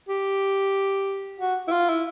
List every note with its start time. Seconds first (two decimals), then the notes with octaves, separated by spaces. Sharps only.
0.08 G4
1.40 F#4
1.68 E4
1.72 F4
1.89 E4